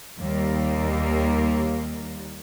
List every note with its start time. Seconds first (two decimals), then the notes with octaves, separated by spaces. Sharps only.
0.19 D#2 G3 A#3